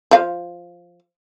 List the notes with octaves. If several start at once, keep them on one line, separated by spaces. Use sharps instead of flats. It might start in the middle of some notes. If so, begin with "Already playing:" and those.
F3 F5